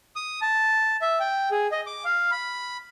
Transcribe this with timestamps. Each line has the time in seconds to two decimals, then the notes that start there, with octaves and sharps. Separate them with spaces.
0.16 D#6
0.41 A5
1.02 E5
1.20 G5
1.51 G#4
1.72 D#5
1.86 D6
2.05 F5
2.32 B5